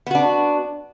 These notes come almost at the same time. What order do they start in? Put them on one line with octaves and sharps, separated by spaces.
B3 F#4 D4